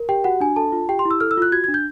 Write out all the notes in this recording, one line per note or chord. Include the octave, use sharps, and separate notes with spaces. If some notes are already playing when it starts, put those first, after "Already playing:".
Already playing: A#4
G4 G5
F#4 F#5
D4 G#5
A4 A5
F4
G4 G5
C6
E4
E6
A4 F6
E6
F4 F#6
F#4 G#6
D4 G#6
G6